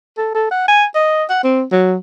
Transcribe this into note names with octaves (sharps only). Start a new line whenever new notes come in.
A4
A4
F#5
G#5
D#5
F#5
C4
F#3